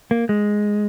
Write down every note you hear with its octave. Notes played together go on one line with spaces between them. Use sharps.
A#3
G#3